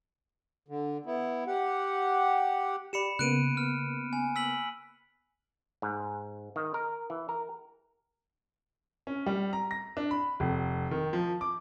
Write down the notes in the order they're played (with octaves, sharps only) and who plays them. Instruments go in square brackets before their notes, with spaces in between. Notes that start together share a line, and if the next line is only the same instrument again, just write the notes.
[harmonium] D3
B3 E4
G4 F#5
[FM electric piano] G4 D5 [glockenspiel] B5 C#7 E7
[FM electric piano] C#3 A#3 B3 [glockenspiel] F#6 D7 D#7
[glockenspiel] F6
G#5
E6 B6 F#7
[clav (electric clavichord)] G#2
D#3
A#4
E3
A#4
[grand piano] C#4
G3
A#5
A#6
D4
B5
F1
D#3
F3
D6